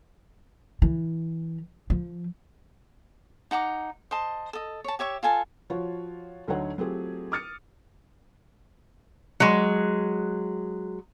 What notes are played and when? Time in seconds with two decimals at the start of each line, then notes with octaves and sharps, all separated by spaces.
0.82 E3
1.90 F3
3.51 D#4 F#5 A#5 D6
4.11 C5 D#5 A5
4.53 A4 D#5
4.84 C#5 A5
4.99 G4 C#5 E5 C#6
5.23 F4 A4 G#5 A5
5.70 F3 F4 F#4 C#5
6.48 D2 D3 F#3 D#4 C#5 F#5
6.78 F#3 A3 C4 F4 G4 G#4
7.32 D6 D#6 F6 A6 C#7 D#7
9.40 F#3 G#3